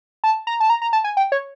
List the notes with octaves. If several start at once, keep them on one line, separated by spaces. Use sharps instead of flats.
A5
A#5
A5
A#5
A#5
A5
G#5
G5
C#5